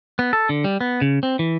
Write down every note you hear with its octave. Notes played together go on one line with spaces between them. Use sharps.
B3
A4
D3
G3
B3
C#3
C4
E3